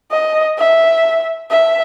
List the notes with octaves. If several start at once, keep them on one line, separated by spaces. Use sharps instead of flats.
D#5
E5
E5